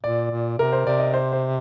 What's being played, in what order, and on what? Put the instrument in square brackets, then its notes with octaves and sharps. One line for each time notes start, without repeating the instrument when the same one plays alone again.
[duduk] A#2 [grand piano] D5
[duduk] A#2
[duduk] C3 [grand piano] A#4
[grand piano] C5
[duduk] C3 [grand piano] D5
[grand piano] D#5
C5
C5